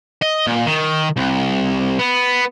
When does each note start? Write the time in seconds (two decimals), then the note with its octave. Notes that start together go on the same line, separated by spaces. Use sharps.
0.22 D#5
0.47 A#2
0.66 D#3
1.17 C2
1.99 B3